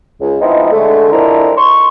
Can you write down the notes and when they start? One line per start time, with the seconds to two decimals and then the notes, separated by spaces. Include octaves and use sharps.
0.21 C#2
0.41 F3 G#3 B3 C4 D#4 E4
0.72 D3 G#3 A3
1.13 F3 G#3 C4 D4 E4 A#4
1.56 C6 C#6